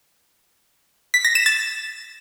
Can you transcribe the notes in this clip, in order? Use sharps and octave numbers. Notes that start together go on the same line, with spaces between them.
B6
A#6
E7
A6